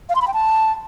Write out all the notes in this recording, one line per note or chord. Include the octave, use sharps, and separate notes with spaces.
F5
C6
B5
G5
A5